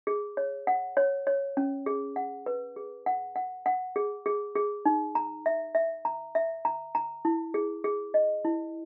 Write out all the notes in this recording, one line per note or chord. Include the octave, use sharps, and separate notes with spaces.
G#4
C#5
F#5
C#5
C#5
C#4
G#4
F#5
B4
G#4
F#5
F#5
F#5
G#4
G#4
G#4
D#4
A#5
E5
E5
A#5
E5
A#5
A#5
E4
G#4
G#4
D#5
E4